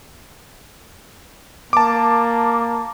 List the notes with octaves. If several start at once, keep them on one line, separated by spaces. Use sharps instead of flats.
A#3 A5 D6